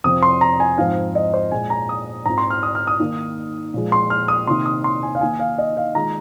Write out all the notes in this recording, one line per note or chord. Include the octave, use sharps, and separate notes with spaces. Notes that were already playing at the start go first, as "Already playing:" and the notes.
F2 C3 F3 C4 D#6
C6
A#5
G#5
G#2 F3 C4 D#4 F5
D#5
C5
A#2 G#3 F4 G#5
A#5
D#6
G#2 G#3 C4 F4 A#5
C6
F6
D#6
F6
D#6
D#3 A#3 D#4
A#2 F3 G#3
C6
F6
D#6
C3 D#3 A#3 D#4 C6
D#6
C6
G#5
F5
D#3 A#3 D#4 G#5
F5
D#5
F5
D#3 G#3 F4 A#5